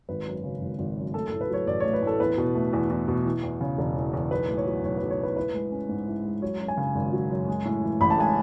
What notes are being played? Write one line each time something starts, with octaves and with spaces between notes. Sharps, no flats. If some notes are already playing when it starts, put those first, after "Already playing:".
G#1 B4
F#2
C#3
G#1
G#1
F#2
A3 A4
A2 A4
B4
F#3 C#5
A1 D5
A3 C#5
B4
A2 A4
E2 B4
B2
A3
E2
E2
B2
E3
E2
C#3
E1
E3
E2
B1 B4
A2
C#5
F#3
B1 C#5
B1 B4
C#5
A2 B4
E4 B4
G#3
C#4
G#2
E4
G#3
F#3 C#5
F#2
G#5
C#3
G#1
F#3
F#2
G#3
A2
E3
A1 B5
A5
G#3 G#5